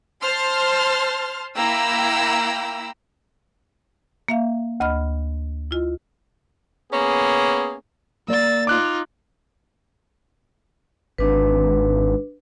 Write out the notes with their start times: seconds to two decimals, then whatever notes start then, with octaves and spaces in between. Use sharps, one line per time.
0.23 C5 A5 C6 F6
1.57 A#3 E4 G5 A#5 B5 E6
4.28 A#3 E5 F5
4.80 D2 D#5 B5 F6
5.71 E4 F4 D#5
6.92 A#3 B3 C#4 G#4
8.28 A#3 D5 F5 E6 A6
8.67 D#4 F4 D6 F#6
11.18 G#1 D4 B4